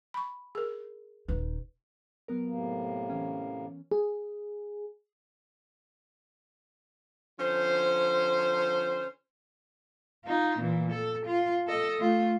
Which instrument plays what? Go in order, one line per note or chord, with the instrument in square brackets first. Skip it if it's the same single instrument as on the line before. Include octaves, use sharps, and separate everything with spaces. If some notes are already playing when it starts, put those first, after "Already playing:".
[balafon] B5 C#6
G#4 A#4
[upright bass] D#1 D#4 [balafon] B4
[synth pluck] F#3 B3 A#4
[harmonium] A2 C3 A#3
[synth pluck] E3 C#4
[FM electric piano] G#4
[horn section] D3 F3 C#4 C5
[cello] D#4 F4
A#2 E3
A4
F4
A4 D#5
A3 F4